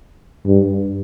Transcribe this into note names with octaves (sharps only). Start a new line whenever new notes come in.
G2